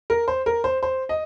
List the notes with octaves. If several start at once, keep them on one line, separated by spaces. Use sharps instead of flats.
A#4
C5
A#4
C5
C5
D#5